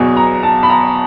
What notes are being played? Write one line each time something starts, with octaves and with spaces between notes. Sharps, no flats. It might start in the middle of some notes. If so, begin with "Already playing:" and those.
Already playing: E2 B2 F#3
A#5
A5
B5
A#5